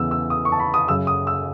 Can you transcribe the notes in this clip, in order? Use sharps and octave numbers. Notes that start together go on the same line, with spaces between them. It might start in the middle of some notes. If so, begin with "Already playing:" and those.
Already playing: E2 C#3 E3 B3 E6
E6
D#6
C#6
A5
B5
D#6
F#2 C#3 F#3 E6
D#6
E6